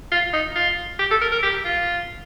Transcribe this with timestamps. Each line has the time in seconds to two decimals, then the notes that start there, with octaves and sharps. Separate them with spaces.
0.12 F4
0.33 D#4
0.56 F4
0.99 G4
1.11 A4
1.22 A#4
1.32 A#4
1.43 G4
1.65 F4